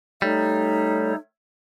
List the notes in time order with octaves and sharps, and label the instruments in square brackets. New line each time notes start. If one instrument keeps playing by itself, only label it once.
[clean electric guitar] G3 [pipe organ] A3 A4 C#5 [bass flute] D#4